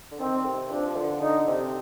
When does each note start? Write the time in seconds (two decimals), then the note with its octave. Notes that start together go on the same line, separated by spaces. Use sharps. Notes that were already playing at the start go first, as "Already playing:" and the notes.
0.11 D3
0.20 D#3 C4
0.45 C3
0.70 F3 D4
0.96 D3
1.21 D3 D#4
1.47 C3